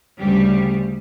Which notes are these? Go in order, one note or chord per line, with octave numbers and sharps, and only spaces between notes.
D2 C#3 G3 G4